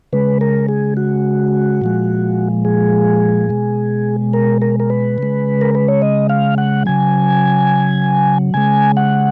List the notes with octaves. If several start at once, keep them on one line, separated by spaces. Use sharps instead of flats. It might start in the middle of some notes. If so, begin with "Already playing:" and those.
C#3 G#3 B4
A#4
G#4
F#4
A#2 F3 G#3
G#4
B2 G#3
A#4
A#4
A#4
B4
C#3 G#3
A#4
B4
C#5
D#5
F5
F#5
C#3 F#3 G#5
C#3 G#3 G#5
F#5